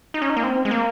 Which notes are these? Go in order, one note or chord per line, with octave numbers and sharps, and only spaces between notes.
D#4
C#4
D#4
A#3
C4
G#3
A#3